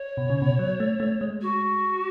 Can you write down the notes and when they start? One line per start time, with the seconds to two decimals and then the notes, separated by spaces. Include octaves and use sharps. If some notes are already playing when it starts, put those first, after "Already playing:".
Already playing: C#5
0.17 B2
0.30 C#3
0.42 B2
0.59 F#3
0.80 A3
1.00 A3
1.21 G#3
1.42 F#4